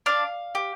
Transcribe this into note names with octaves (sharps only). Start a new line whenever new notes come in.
D4 F5
G4